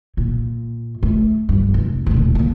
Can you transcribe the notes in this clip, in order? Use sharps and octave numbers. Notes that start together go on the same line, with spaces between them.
A#2
A3
G2
F1
D#1 D2
C2 A#3